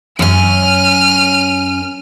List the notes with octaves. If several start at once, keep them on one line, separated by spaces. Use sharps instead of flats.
F#2 C#4 F6 D#7